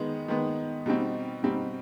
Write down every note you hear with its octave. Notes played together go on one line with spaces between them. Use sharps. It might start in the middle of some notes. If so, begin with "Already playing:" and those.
Already playing: D#3 G#3 B3
D#3 G#3 B3
B2 G3 C4 D#4
B2 G3 C4 D#4